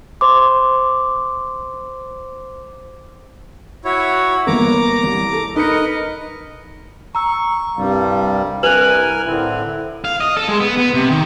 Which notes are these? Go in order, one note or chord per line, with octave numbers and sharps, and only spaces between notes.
C5 C6 D6
E4 F#4 C#5
G1 A#3 A#5 D6
C2
A4
D#4 A#4 B4 D#5 C#7
A#5 C#6 E6
C2 G2 G3 F5
C2 A#4 B4 G#5 F#6 F7 F#7
A2 D3 C4 E4
F5
D#5
A4
G#3
B3
B3
C3
D#3